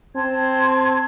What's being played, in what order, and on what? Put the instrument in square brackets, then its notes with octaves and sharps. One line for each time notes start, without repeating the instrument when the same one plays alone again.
[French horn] C4 [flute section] A5 C6 G#6